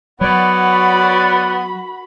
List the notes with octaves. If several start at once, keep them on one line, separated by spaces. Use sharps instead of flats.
F#3 B3 F#4 C#5 D5 B5